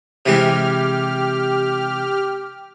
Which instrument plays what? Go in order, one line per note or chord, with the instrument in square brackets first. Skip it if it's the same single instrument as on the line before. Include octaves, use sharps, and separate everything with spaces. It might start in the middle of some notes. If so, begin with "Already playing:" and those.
[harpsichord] C3 E3 G#3 [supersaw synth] G4 F6